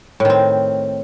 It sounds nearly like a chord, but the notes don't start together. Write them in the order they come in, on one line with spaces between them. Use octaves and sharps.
A2 D#3 C4